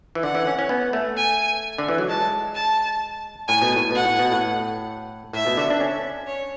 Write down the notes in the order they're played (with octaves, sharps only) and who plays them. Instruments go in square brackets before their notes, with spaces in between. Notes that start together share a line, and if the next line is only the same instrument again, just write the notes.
[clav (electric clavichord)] E3
[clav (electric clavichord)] D3 [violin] F#5
[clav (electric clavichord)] E3
C#4
C#4
B3
A3
[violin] G#5
[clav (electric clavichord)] D3
E3
F#3
[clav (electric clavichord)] G#3 [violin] A5
[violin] A5
[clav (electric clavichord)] A2 [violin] G#5
[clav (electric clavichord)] B2
A2
[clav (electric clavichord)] B2 [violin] F#5
[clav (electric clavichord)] A2
B2
A2
[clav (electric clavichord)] A2 [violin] E5
[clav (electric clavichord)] B2
D3
D4
C#4
[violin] C#5